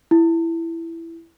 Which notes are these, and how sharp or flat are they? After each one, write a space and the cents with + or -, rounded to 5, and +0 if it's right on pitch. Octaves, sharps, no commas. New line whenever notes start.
E4 +10